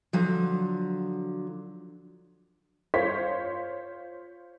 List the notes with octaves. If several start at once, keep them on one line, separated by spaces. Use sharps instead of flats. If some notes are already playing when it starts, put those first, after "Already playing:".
D3 F3 F#3
F4 C5 C#5 B6